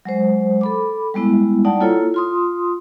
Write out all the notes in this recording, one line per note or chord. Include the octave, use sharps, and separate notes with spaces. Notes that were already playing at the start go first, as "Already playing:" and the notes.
F#3 G#3 C5
A4 B5 D6
G3 G#3 B3 E4
G3 D#4 D5 F#5 G5 A5
A#3 E4 F4 A4 C#5
F4 C6 D#6